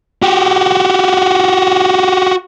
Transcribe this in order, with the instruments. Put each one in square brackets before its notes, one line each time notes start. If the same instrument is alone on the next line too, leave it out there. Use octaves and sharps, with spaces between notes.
[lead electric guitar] F#4 G4